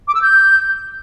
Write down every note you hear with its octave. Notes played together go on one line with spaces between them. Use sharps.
D6
E6
G6